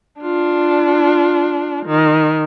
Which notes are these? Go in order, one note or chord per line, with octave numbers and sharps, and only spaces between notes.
D4 F4
D#3